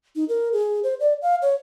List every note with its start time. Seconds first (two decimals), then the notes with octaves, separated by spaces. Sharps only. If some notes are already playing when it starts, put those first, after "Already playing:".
0.16 D#4
0.29 A#4
0.53 G#4
0.84 C5
1.00 D5
1.22 F5
1.42 C#5